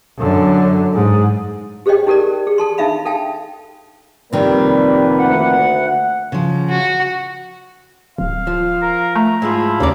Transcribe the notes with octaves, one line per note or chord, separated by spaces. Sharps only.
F#2 D3
G#2
G4 G#4 C5 C#5 D#5 G5
D#4 G4 A4 A#4 D5
G#4
A4 A5 C6
D4 D#4 E5 F5 B5
A4 F5 G5 A5
F2 C3 D#3 G3 A#3 C4 B4
D2 F#5
C#3 F3
F#4
D1 F5
F3
A#4
A3 A#5
G#2 F3 G#3 E4 F4
D#2 C#3 A#3 C#4 D5